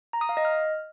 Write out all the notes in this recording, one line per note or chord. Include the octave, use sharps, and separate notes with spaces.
A#5
D#6
F5
D#5
F6